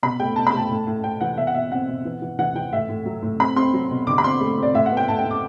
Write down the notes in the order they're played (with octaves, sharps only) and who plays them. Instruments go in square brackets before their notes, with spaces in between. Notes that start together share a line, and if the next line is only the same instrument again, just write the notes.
[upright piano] B2 B5
A3 G5
B2 A5
B5
A3 A5
A2
A2
A2 G5
E3 F#5
B2 E5
F#5
B2 E5
C4 F#5
B2
E3
E3
E3 F#5
E3 G5
A2 E5
A2
F#3
A2
C4 B5
C4 C6
F#3
B2
D3 D6
B5
C4 C6
A3
C4 D5
A2 E5
F#5
B3
G5
A2 A5
G5
A2
D6